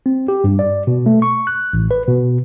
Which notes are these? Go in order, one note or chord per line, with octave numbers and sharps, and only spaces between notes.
C4
G4
G2
D5
B2
A3
C#6
F#6
A1
B4
B2